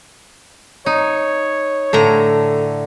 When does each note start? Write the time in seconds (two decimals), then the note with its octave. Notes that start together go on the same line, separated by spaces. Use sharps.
0.86 D#4 C#5
1.93 A2 D3 A4 A#5